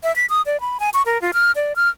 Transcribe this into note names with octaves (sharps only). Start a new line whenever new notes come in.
E5
B6
D#6
D5
B5
G#5
C#6
A#4
F4
F6
D5
F6